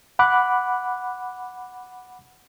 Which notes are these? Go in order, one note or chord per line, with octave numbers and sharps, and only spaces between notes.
F#5 B5 D6 F#6